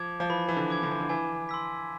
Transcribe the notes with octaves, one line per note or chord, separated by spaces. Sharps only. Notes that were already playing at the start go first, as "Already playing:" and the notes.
Already playing: F3 D6 G#6
F3
E3 B5
E3
D3
D6 G#6
D3
E3
D3
E3 G#5
C6 E6 B6